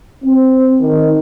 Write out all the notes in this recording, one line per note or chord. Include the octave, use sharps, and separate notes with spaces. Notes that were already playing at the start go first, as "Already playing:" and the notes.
C4
D#3